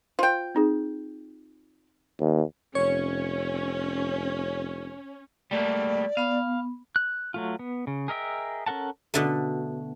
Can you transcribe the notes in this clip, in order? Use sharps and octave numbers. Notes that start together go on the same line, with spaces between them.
F4 C5 G5
C4 D#4 G#4
D#2
F1 C#4 C#5 G#6 C#7
G3 A3 A#3 D5
B3 F5 B5
F#6
F#3 A3 F4
B3
C#3
G#4 A#4 D#5 E5 G5
C#4 A4 A#4 F#5 A5
B2 D3 A3